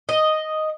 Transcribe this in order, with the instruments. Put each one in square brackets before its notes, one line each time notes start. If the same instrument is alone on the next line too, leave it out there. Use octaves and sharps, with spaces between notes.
[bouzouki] D#5